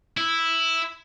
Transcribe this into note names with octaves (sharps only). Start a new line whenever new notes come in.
E4